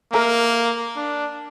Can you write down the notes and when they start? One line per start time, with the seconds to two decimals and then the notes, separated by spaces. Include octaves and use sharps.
0.12 A#3 A#4 E5 A#5
0.97 D4